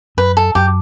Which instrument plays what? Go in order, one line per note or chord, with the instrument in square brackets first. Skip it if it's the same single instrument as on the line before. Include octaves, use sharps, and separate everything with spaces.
[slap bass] F#2 [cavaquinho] B4
[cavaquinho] A4
[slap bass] F#2 [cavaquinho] G4